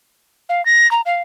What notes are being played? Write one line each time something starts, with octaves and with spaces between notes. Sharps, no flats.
F5
A#6
A#5
F5